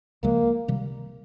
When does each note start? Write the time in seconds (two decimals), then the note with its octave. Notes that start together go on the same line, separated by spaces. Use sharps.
0.23 C#2 C#3 F3 G#3 A#3
0.68 C3 D#3 G3